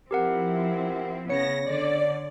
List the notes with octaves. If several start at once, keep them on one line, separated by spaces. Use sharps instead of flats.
F3 C4 E4 G4 A#4 F#5
C#3 B3 C#5 A#6 C#7
D3 D5